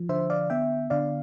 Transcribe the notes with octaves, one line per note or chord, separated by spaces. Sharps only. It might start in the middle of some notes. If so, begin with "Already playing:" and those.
Already playing: F3
D3 C5 E5
D5 F5
B3 E5 G5
D3 D5 F5